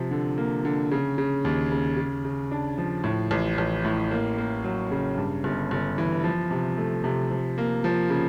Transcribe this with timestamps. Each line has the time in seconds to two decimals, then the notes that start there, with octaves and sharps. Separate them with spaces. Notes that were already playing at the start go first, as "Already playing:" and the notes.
Already playing: C3 F3
0.11 D3
0.38 A#3
0.65 D3
0.91 C#3
1.18 C#3
1.45 D#2
1.72 C#3
1.97 C#3
2.25 C#3
2.51 D4
2.78 F3
3.04 A2
3.31 A1
3.58 A1
3.85 A2
4.11 A#3
4.38 A#3
4.64 F#3
4.91 C#3
5.17 G2
5.44 G1
5.71 G1
5.98 E3
6.24 F3
6.51 C3
6.78 A3
7.04 C3
7.31 F3
7.58 A#3
7.84 F3
8.10 C#3